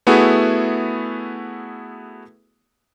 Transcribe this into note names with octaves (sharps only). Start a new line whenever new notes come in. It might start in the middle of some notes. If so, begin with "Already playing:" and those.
A3 B3 E4 F#4 G#4